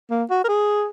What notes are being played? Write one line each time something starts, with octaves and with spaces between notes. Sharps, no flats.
A#3
F#4
A#4
G#4